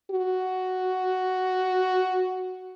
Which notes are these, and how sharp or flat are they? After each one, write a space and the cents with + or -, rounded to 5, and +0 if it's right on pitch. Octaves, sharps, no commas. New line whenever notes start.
F#4 +5